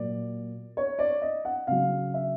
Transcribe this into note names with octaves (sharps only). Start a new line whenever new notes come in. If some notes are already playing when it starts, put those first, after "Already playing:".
Already playing: A#2 F#3 D5
C#5
D5
D#5
F#5
C#3 F#3 F5
E5